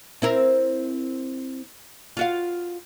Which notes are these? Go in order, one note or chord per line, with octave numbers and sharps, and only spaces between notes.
C4 E4 A#4
F4 F#4 F5